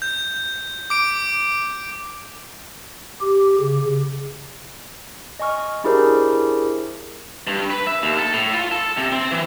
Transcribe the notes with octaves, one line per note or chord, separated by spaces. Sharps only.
G6
D6 D7
G4
C#3
D#5 G#5 C#6 F6
D4 E4 G4 G#4 A#4 C5
G2
B4
E5
D#2
A4
A2
F4
A4
C3
C4
E3